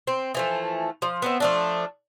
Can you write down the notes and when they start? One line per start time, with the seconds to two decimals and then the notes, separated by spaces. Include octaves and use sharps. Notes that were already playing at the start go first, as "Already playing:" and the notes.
0.07 C4
0.34 E3 F3 A3
1.02 F3
1.22 B3 C4 E5
1.40 F3 A3 D4